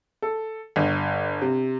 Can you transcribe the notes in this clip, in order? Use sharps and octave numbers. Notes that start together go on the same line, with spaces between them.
A4
G1
C3